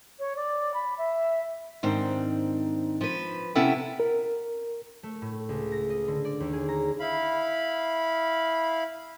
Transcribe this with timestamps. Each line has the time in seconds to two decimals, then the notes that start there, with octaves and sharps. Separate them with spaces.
0.19 C#5
0.36 D5
0.74 B5
0.98 E5
1.83 G#2 D#3 C4 D4
3.01 F3 B4
3.55 C3 B3 C#4 E4 A4 G5
4.00 A#4
5.03 A3
5.22 A2
5.49 C#2
5.72 A#6
5.90 D#5
6.08 D3
6.25 D5
6.40 D#2
6.53 G#4
6.68 A#5
6.99 E4 F5 B5